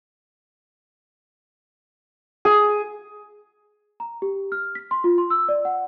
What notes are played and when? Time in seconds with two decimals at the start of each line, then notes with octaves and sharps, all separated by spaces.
2.45 G#4
4.00 A#5
4.22 G4
4.52 F6
4.75 B6
4.91 C6
5.04 F4
5.18 C6
5.30 E6
5.49 D5
5.65 F#5